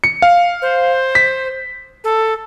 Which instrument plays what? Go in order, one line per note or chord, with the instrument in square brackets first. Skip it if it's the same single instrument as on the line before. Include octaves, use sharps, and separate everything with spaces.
[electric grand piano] C#7
F5
[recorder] C5
[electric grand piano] B6
[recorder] A4